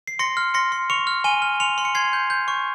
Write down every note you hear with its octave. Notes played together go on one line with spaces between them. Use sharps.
C7
C6 A#6 C#7
F6
C6 A#6 C#7
C6
C#6 C#7 F7
F6
G#5 D#7 G7
F6
C6 C#7 F7
C6
C#7
C6 G#6 C7
G6
G6
C#6